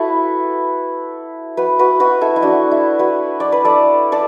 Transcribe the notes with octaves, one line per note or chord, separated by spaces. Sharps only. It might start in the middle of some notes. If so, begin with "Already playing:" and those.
Already playing: E4 F#4 A4 B4
F#4 B4
F#4 B4
F#4 B4
E4 A4
E4
D4 F#4
E4
F#4 B4
D5
B4
A4 D5
A4 D5